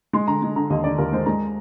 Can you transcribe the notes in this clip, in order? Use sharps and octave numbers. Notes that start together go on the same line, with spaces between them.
G#3 C6
D3 A#5
G#3
D3 A#5
D#2 D#5
D3 D5
D#2 A#4
G#3 C5
G#3 A#5